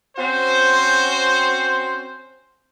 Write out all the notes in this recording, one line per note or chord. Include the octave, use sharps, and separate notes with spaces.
C4 C#4 F#4 C5